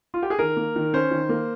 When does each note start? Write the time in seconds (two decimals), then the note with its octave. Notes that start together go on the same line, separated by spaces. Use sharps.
0.14 F4
0.23 G4
0.30 G#4
0.39 D#3 A#4
0.57 A#3
0.76 D#3
0.93 C#4 C5
1.11 D#3
1.29 A#3